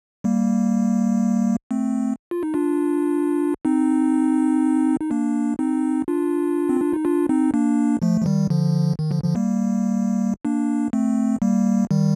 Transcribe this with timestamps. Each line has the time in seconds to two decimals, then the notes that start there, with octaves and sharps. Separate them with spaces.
0.24 G3 A#3
1.71 A3 C4
2.31 F4
2.43 D#4
2.54 D4 F4
3.65 C4 D#4
5.01 D#4
5.11 A#3 D4
5.59 C4 D#4
6.08 D4 F4
6.69 C4
6.81 D4
6.93 D#4
7.05 D4 F4
7.29 C4 D#4
7.54 A#3 D4
8.02 F3 A3
8.22 F3
8.26 D#3 G3
8.50 D3 F3
8.99 D#3
9.11 D3 F3
9.23 D3 F3
9.35 G3 A#3
10.45 A#3 D4
10.93 A3 C4
11.42 G3 A#3
11.91 D#3 G3